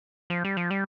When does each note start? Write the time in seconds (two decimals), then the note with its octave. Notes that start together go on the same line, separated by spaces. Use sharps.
0.30 F3
0.44 G3
0.57 F3
0.71 G3